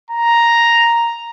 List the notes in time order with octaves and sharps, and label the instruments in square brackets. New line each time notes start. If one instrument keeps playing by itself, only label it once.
[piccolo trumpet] A#5